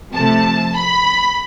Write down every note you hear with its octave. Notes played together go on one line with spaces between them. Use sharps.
C3 F3 A3 A5
B5